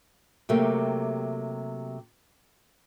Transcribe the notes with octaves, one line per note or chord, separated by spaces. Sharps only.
C3 F#3 A3 A#3 G4